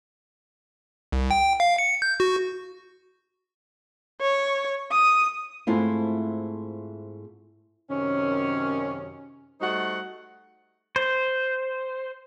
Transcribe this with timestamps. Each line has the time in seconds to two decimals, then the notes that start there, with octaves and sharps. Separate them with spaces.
1.12 C2
1.31 G5
1.60 F5
1.78 C#7
2.02 G6
2.20 F#4
4.21 C#5
4.92 D#6
5.67 G#2 A3 C4 E4 F4
7.90 F#2 C3 D#3 C#4
9.61 G3 A3 D#4 F#4 C5 F#5
10.96 C5